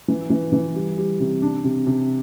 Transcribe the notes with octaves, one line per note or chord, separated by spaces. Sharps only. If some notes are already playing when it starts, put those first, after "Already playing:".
E3
E3
E3
G3
G3
C3
D4
C3
C3